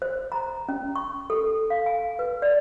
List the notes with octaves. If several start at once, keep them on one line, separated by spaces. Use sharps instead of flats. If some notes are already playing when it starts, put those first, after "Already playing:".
C5
A#5
C#4
C#6
A4
F5
G#5
B4
D5